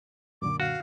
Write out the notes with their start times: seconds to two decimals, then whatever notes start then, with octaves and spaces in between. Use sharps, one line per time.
0.42 F#2 A#2 D3 D6
0.60 F#4 F5